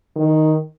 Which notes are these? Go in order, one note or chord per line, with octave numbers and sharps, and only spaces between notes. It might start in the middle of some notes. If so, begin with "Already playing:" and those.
D#3